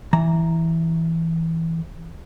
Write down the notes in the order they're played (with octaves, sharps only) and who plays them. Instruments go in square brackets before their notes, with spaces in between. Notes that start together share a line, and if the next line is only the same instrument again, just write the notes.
[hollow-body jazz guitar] E3 A#5